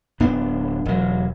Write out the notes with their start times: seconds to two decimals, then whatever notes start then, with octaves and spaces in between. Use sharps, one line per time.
0.20 D1 B3 D4
0.86 E1 F#3